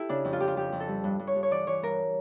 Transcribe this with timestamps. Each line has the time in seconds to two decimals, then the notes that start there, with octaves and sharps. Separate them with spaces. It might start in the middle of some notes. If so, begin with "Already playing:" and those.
Already playing: E4 G4 A4
0.09 C#3 D4
0.25 F2
0.33 F4
0.40 F2 G4
0.48 F4
0.56 F2 G4
0.72 F2
0.80 A4
0.88 G3
1.04 G2
1.19 G2
1.27 C#5
1.35 G2
1.43 C#5
1.51 E3 D5
1.67 E3 C#5
1.82 G2 A#4